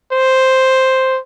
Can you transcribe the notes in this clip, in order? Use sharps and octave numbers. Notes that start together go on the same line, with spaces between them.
C5